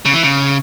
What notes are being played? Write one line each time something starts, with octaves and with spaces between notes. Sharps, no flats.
C#3
E3
C#3